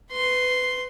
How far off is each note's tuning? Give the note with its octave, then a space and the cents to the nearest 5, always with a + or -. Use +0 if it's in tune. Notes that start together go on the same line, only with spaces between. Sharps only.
B4 +25 C6 +0